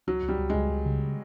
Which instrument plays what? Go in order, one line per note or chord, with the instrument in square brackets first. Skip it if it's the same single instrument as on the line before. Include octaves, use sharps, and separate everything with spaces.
[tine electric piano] C#2 [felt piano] F#3
[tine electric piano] C#2
[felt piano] G3
[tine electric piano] C#2
[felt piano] G#3
[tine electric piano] C#2
C#2
C#3